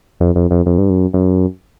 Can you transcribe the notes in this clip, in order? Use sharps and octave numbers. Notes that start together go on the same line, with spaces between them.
F2
F2
F2
F2
G2
F#2
F#2